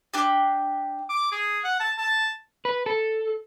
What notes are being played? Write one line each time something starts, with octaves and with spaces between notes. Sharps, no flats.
D4 G4
D6
G#4
F#5
A5
A5
B4
A4